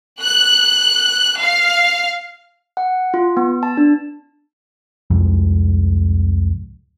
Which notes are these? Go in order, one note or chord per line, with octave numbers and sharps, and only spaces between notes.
F#6
F5
F#5
F4
B3
A5
D4
C2 F2 G#2